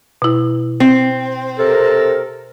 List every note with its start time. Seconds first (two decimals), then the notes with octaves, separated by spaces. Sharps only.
0.22 B2 E4
0.80 C4
1.58 C3 A4 A#4